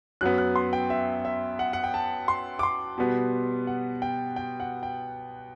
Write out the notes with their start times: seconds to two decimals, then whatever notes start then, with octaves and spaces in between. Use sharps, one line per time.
0.21 F#2 F#3 B3 F#6
0.38 F#6
0.56 C6
0.73 G5
0.90 E5
1.25 E5
1.59 F#5
1.73 F#5
1.84 G5
1.94 A5
2.28 C6
2.59 D6
2.63 C6
2.98 B2 G3 B3
3.67 F#5
4.02 G5
4.36 G5
4.60 F#5
4.83 G5